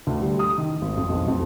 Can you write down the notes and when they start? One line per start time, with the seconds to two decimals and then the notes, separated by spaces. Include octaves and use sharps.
0.07 D2
0.21 G3
0.39 D#6
0.58 D#3
0.82 G#1
0.97 F2
1.10 B1
1.28 F2